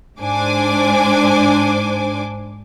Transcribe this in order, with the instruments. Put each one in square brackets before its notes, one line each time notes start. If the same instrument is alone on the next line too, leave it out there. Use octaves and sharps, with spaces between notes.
[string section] G#2 D4 C5 G#5 D6